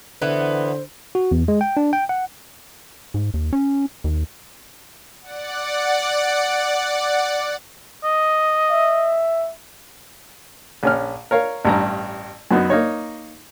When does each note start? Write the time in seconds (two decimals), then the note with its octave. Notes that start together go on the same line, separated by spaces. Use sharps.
0.22 D3 E3 B3 C5
1.15 F#4
1.31 E2
1.48 G#3
1.61 G5
1.77 D4
1.93 G5
2.09 F#5
3.14 G#2
3.34 D#2
3.53 C#4
4.04 D#2
5.22 D5 F#5
8.04 D#5
8.71 E5
10.83 A#1 C#4 F6
11.31 A#4 C#5 F5
11.65 A1 G2 A#5
12.51 F#2 F#3 B3 D#4
12.70 A#3 D#4 C#5